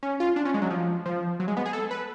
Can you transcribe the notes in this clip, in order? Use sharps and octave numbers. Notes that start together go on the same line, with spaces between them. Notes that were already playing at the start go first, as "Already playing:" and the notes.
C#4
F4
D4
C#4
G#3
F#3
F3
F3
F#3
G#3
B3
G#4
A4
B4